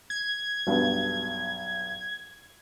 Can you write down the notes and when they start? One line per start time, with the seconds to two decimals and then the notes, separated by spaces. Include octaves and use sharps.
0.10 G#6
0.67 B1 G2 B3